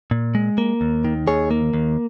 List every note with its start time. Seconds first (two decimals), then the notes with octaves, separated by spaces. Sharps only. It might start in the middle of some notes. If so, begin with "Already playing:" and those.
0.11 A#2
0.35 G#3
0.58 A#3
0.81 D#2
1.04 D#3
1.27 D#2 G#4 C#5
1.51 A#3
1.73 D#2